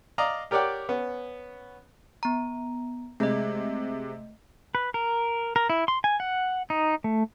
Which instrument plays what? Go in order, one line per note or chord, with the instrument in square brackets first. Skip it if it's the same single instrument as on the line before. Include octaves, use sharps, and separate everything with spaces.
[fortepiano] D5 D#5 F5 A#5
G4 A#4 C#5 D5 F#5 G5
B3 C#4
[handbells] B3 A#5
[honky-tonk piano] C3 G#3 [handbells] A3 D#5
[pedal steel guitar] B4
A#4
A#4
E4
C6
G#5
F#5
D#4
A3